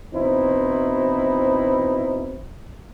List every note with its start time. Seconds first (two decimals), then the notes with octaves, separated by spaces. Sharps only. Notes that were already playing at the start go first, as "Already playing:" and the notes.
0.14 B2 E3 C4 D#4 E4 C5